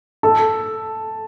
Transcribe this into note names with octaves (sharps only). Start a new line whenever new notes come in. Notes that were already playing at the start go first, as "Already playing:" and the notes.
A4